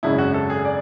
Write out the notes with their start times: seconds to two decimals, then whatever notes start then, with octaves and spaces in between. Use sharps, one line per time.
0.03 G#1 F#2 C#3 G#3 C#4 E4
0.18 F#4
0.34 A4
0.50 G#4
0.65 D5